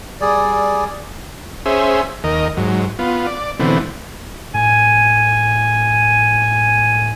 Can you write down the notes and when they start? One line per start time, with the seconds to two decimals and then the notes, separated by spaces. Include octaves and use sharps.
0.21 G3 G#4 D5
1.66 C#4 G#4 C5 E5
2.24 D#2 A#4 D#5
2.57 G#2 F#3
2.99 B3 F4
3.27 D5
3.60 B2 D3 E3 A3 C4
4.54 A2 G#5